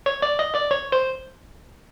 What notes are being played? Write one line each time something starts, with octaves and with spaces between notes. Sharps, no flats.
C#5
D5
D#5
D5
C#5
C5